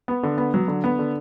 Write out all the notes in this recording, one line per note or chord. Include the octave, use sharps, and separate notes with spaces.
B3
D3
B3
F#3
D3
B3
D3